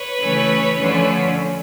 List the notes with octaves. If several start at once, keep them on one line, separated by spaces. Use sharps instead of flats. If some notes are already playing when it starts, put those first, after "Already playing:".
Already playing: B4 C#5
C#3 E3 A3 C#4
D3 F3 A3 C#4